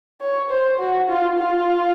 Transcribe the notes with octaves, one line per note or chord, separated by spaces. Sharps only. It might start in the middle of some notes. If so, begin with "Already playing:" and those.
C#5
C5
F#4
F4
F4